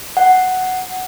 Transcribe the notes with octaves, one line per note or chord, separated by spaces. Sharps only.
F#5